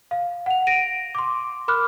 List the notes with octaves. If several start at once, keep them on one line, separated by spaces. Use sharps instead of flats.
F5
F#5 F7
A#6 D7 D#7
C6 D6
A#4 B5 D6 F6 F#6